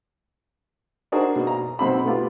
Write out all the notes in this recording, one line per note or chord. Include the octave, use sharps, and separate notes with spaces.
D4 D#4 F#4 G#4 A#4 C5
B2
A#5
B1 C4 B5
A3 B3 F4 G4